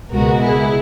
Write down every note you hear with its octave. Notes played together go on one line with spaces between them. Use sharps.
C#2 B2 G#3 B3 F#4 A#4
E4 G#4